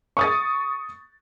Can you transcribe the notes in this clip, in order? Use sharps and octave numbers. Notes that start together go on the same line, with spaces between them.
C#6 D#6 A6